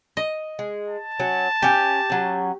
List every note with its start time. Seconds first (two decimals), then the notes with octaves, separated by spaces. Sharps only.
0.17 D#5
0.59 G#3
0.90 A5
1.20 F#3 C#4
1.62 C#4 G4 G#5
2.10 F#3 C#4